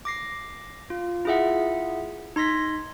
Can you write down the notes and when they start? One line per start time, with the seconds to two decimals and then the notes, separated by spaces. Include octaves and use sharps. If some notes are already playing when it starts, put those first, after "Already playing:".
0.05 D6 A#6 C7
0.90 F4
1.25 E4 F4 G#4 E5 F#5
2.36 D#4 C6 A#6 B6